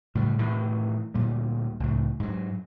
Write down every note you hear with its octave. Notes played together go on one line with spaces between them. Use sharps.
A2 C#3 G3
A2 C3 D#3 E3
D2 A#2 G3
C#2 A2
G#2 F#3